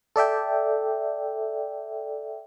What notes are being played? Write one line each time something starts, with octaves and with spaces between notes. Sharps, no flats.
A4 D5 E5 G5